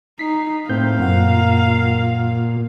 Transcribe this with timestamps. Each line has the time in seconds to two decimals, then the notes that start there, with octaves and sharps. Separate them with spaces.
0.19 D#4 B6 C7
0.69 A2 A#3 C4 F5 G6
0.99 F#2 A#2 F#5